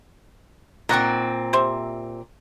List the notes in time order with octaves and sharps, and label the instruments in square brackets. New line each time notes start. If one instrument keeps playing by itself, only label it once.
[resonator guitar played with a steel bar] A#2 C4 [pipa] D#3 F#5 C#6
[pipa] G4 C5 E5